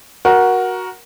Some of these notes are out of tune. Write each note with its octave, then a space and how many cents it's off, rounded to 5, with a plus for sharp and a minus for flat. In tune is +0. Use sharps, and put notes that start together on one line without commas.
F#4 +0 A#4 +15